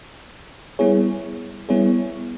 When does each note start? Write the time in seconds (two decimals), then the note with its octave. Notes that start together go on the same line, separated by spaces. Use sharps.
0.79 G3 B3 E4 G#4 C#5
1.69 G3 B3 E4 G#4 C#5